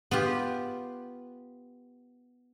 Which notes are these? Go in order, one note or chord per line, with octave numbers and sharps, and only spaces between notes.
B3 F4 G4